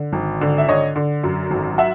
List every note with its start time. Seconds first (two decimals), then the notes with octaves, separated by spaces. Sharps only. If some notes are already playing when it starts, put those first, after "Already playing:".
Already playing: D3
0.13 G#1
0.41 D3
0.58 E5
0.68 D3 C#5 D#5
0.96 D3
1.24 F#2
1.51 G#1
1.78 E5 F#5